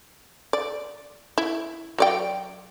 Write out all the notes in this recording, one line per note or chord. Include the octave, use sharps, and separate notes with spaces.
D5
E4
F#3 D5 G5